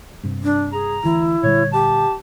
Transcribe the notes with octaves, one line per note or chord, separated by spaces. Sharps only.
G2 C3
D4
G#4 A#5
D2 E3 E4
A#2 D3 G3 C#5
G4 A5